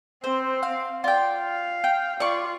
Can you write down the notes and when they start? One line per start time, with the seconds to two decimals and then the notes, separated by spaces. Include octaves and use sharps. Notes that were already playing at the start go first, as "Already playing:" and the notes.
0.24 C4 C5
0.63 F5
1.04 F4 D5 G5
1.39 F5
1.84 G5
2.20 F4 D5 C#6